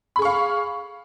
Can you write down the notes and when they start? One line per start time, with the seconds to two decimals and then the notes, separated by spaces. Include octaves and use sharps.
0.16 B5
0.19 G#4
0.22 C#6
0.25 F5